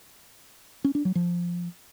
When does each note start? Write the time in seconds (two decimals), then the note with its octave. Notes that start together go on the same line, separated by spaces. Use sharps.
0.84 C#4
0.95 D4
1.05 F#3
1.15 F3